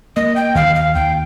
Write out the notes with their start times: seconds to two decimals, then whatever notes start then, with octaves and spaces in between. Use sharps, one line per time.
0.16 A#3 D#5
0.36 G5
0.55 D#2 F5
0.75 F5
0.95 D#2 G5